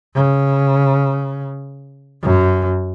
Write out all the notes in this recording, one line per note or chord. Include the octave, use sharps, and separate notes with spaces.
C#3
F#2